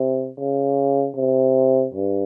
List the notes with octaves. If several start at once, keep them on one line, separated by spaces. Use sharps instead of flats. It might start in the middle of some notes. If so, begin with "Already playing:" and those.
Already playing: C3
C#3
C3
G2